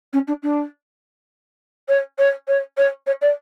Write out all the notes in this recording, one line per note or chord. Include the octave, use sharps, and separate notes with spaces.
C#4
D4
D4
C#5
C#5
C#5
C#5
C#5
D5